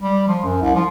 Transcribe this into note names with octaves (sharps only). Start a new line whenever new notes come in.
G3
F3
F#2
C2
F3